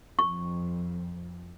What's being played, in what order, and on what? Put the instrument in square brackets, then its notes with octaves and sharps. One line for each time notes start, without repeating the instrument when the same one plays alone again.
[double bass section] F2 [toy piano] C#6